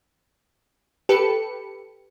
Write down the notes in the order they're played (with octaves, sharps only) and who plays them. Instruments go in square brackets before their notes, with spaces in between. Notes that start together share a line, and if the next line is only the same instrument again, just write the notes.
[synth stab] G4 A4 B4 C#7